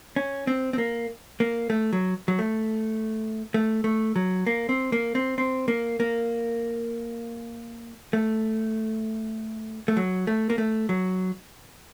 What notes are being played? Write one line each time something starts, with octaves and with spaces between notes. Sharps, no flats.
C#4
C4
C4
A#3
A#3
A3
F#3
F#3
A3
A3
A3
F#3
A#3
C4
A#3
C4
C4
A#3
A#3
A3
A3
F#3
A3
A#3
A3
F#3